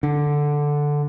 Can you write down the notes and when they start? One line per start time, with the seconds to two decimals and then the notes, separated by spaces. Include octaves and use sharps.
0.03 D3